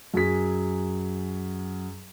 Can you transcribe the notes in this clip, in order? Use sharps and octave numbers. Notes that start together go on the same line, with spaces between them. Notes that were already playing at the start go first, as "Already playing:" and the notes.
F#2 F#3 G#4 B6